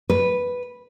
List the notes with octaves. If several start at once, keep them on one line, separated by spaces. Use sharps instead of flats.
B4